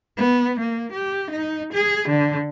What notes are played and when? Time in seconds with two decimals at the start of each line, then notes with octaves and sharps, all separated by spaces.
0.17 B3
0.60 A#3
0.93 G4
1.31 D#4
1.74 G#4
2.09 D3